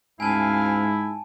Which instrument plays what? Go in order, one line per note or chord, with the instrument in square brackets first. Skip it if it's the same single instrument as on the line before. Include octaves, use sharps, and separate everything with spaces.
[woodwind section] D2 C#4 F5 [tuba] G#2 [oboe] E4 [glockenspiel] G#5 A5